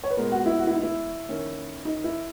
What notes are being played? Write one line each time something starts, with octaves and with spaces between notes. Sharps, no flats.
C#5
B4
A#2 G#3 B3 A#4
F#4
E4
F#4
E4
D#4
E4
D#3 A#3 C#4
D#4
E4